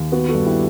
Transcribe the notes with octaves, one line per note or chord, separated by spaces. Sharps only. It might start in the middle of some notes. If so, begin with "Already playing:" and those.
Already playing: D#2
B3 F#4
F#4 A4
G2
E4 G4